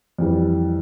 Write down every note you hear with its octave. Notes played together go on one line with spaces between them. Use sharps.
F2 E3 G3